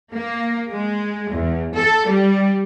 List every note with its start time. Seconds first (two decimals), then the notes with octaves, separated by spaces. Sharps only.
0.13 A#3
0.70 G#3
1.31 E2
1.74 A4
2.07 G3